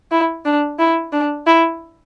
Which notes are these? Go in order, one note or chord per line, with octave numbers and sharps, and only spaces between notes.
E4
D4
E4
D4
E4